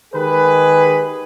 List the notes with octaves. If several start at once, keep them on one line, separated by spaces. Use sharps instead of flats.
D#3 G#3 G4 G#4 A#4 B4